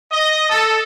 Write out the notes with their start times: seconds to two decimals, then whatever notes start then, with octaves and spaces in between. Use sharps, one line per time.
0.11 D#5
0.49 A4